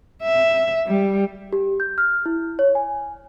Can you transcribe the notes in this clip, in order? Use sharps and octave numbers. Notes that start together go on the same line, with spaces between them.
E5
G3
G4
G6
F6
E4
C#5
G#5